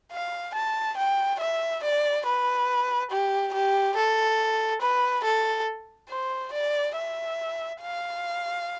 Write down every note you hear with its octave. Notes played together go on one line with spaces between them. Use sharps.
F5
A5
G5
E5
D5
B4
G4
G4
A4
B4
A4
C5
D5
E5
F5